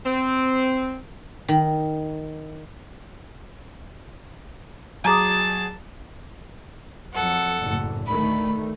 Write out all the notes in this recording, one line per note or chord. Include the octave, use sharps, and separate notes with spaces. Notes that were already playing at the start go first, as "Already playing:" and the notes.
C4
D#3
F#3 G#4 A5 A#5 D6 D#6
F2 F#3 A4 F#5
F#1 A2
D2 D#3 A3 B5